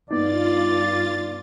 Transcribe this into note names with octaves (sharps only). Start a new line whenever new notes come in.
G2 B3 D#4 F4 D5 A6